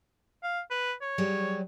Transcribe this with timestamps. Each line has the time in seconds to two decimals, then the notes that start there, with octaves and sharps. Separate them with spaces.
0.43 F5
0.71 B4
1.02 C#5
1.18 F#3 G3 G#4